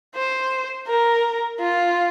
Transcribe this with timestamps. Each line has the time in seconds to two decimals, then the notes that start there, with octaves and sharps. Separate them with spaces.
0.15 C5
0.87 A#4
1.60 F4